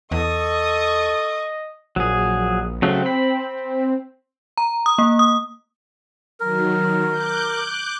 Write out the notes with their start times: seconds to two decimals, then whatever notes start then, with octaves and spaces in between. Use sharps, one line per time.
0.11 E2 A4 D#5 C#6 D#6
1.96 A#1 F#3 G#4
2.82 C#3 F#3 A3 C4
3.06 B5
4.58 A#5
4.86 D#6
4.98 A#3
5.19 D#6
6.40 D#3 F#3 A#4
7.10 D6 F#6 G6